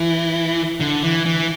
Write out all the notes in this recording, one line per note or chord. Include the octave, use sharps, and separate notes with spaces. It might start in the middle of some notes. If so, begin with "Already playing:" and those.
Already playing: E3
D3
E3
E3